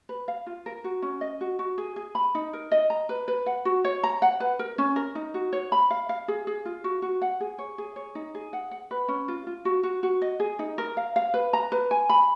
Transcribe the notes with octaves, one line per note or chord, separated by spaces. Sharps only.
B4
F5
F4
A#4
F#4
C#4
D#5
F#4
F#4
G#4
G#4
B5
D#4
A#4
D#5
A#5
B4
B4
F#5
F#4
C#5
A#5
F#5
B4
A#4
C#4
A#4
D#4
F#4
C#5
B5
F5
F5
G#4
G#4
F4
F#4
F#4
F#5
G#4
C#5
G#4
C#5
D#4
G#4
F#5
F#5
B4
C#4
F4
F4
F#4
F#4
F#4
D#5
G#4
D#4
A#4
F5
F5
B4
A#5
B4
G#5
B5